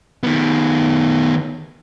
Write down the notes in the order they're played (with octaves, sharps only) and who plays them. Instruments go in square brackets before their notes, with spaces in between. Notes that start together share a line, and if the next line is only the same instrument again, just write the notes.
[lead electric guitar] D#3 B3